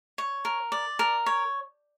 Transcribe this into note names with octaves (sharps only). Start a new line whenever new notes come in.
C#5
A#4
D5
A#4
C#5